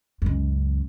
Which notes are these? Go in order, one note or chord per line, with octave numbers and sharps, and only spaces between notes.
C#2 F#2